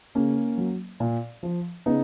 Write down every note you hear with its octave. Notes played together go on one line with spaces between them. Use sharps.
C#3 A#3 C#4
F#3
A#2
F3
C#3 B3 D#4